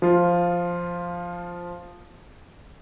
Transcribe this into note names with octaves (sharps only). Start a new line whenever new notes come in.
F3 F4